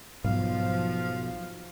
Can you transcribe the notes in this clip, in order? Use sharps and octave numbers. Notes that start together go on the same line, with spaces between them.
B1 G#2 F3 F5